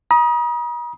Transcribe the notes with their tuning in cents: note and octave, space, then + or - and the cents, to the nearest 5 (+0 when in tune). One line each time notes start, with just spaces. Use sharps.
A#5 +45 D#6 +5